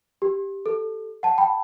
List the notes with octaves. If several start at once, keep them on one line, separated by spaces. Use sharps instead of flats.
G4
A4
F#5 A5
G5 B5